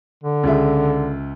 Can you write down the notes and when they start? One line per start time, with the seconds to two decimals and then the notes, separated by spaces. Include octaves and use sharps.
0.24 D3
0.43 C#2 G#4 E5